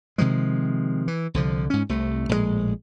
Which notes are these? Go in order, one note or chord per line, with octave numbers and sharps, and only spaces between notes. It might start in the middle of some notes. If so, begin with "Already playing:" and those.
C3 D#3 F3 G#3
E3
C2 D3 F3
G#2 C#4
C2 C3 A3
A#1 A2 C3 G#3